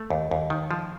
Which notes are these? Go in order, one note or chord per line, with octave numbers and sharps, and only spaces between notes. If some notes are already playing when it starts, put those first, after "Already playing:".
Already playing: A3
D#2
D#2
D#3
F3